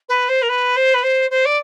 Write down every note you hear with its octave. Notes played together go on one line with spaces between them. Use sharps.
B4
C5
A#4
B4
C5
B4
C5
C5
D5